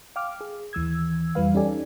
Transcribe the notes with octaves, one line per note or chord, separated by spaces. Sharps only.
F5 G5 D6 F6
G#4
D#2 E3 E6 G#6
F2 E3 G3 B4 F5
C#4 D#4 G4 A4 D5 G#5